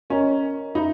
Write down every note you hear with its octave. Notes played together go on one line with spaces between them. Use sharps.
C#4 A#4 D#5 A#5
D#4 E5 B5